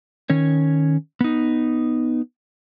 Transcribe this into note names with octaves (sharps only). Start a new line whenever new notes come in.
D#3 C#4 C#5
B3 D#4